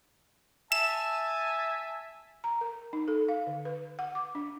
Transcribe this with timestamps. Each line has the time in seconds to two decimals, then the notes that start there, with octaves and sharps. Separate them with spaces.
0.72 E5 G#5 A5 E7
2.44 A#5
2.61 A#4
2.93 D#4
3.08 A4
3.28 F5
3.47 D3
3.65 B4
3.99 F#5
4.15 D6
4.35 D4